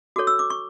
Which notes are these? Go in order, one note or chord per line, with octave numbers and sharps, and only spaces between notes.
F#4 A4 C#5 D6
E6
D6
C#6